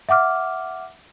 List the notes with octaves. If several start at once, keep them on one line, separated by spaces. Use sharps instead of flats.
E5 F#5 D6 F6